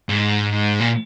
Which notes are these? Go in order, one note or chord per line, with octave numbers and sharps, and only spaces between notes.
G#2
A#2